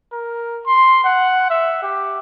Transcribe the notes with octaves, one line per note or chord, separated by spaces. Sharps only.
A#4
C6
F#5
E5
G4